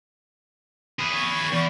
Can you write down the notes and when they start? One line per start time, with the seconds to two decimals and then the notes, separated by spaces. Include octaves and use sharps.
0.99 G#4 B4
1.13 C#6
1.52 E2